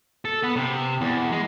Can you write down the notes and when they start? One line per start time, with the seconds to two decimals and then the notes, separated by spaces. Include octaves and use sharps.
0.25 A4
0.43 B3
0.56 C3
1.01 E2
1.32 G#3